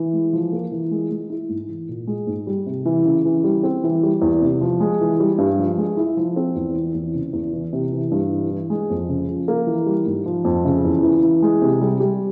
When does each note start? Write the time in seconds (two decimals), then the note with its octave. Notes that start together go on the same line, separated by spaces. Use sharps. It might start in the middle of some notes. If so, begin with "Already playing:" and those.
Already playing: E3
0.13 G#3
0.33 F3
0.52 A#3
0.72 E3
0.91 G#3
1.11 G#3
1.30 E4
1.49 G#2
1.69 E3
1.89 A#2
2.07 G#3
2.27 G#2
2.47 G3
2.66 C3
2.85 E3
3.05 C#3
3.25 E3
3.44 G3
3.63 C4
3.84 E3
4.03 G3
4.22 E2
4.42 C3
4.61 F3
4.80 G#3
5.01 E3
5.20 G3
5.38 G2
5.59 F3
5.78 G#3
5.97 E4
6.17 F3
6.36 C4
6.55 E2
6.75 E3
6.94 E2
7.14 C#3
7.33 E2
7.53 E3
7.73 C3
7.92 E3
8.11 G2
8.32 E3
8.50 E3
8.70 G#3
8.90 F2
9.09 C#3
9.28 F3
9.48 A#3
9.67 E3
9.86 G3
10.06 G#2
10.26 F3
10.45 F2
10.65 C#3
10.85 E2
11.03 E3
11.23 E3
11.42 G#3
11.62 C3
11.81 G3
12.00 G3